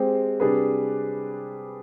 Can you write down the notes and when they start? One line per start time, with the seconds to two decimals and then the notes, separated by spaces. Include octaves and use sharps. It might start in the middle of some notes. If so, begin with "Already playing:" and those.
Already playing: G#3 C4 G4 C5
0.40 C3 G3 D4 G#4 B4